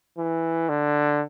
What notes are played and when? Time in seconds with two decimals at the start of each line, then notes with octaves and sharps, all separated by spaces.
0.18 E3
0.69 D3